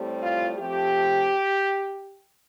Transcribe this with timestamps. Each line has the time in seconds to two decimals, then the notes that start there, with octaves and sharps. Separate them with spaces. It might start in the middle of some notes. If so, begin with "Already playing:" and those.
Already playing: A2 G3 C4
0.22 F4
0.58 F3 A3 C4 G4